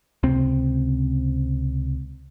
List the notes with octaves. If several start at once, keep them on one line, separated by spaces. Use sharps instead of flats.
C#2 C3 C4